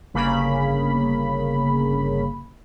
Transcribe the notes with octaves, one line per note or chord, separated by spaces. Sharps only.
G1 C#3 A#3 B5